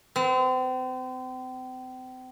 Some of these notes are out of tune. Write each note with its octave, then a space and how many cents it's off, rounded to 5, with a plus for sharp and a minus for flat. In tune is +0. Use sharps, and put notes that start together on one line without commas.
C4 -35